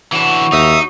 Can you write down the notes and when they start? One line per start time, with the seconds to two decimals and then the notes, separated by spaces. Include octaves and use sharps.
0.12 E3 D4 F#4 C#5 B5
0.52 D#2 D#4 E5 D#6